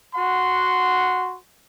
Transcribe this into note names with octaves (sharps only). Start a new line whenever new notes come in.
F#4 F#5 C6